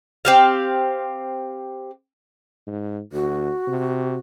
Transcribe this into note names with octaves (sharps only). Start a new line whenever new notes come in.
C4 G4 F5
G#2
D2 F#4
C3